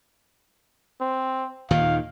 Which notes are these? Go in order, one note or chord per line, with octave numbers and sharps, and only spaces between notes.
C4
D#2 A#2 D#3 F5